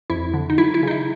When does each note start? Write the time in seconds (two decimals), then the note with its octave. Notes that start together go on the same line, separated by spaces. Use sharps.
0.10 F2 E4
0.34 D3
0.50 D#4
0.58 F#3 E4
0.74 E4
0.83 C#3 D#4
0.91 E4